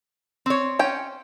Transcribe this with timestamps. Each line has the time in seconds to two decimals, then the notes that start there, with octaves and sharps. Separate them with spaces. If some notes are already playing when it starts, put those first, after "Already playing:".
0.46 C4 C#5
0.79 C#4 G5